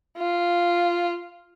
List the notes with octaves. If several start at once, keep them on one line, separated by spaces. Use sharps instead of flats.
F4